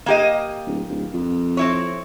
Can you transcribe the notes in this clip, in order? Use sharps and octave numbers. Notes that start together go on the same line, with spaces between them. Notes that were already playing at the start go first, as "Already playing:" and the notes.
A#3 G4 D#5
D1
D1
F2
C4 E4 C#5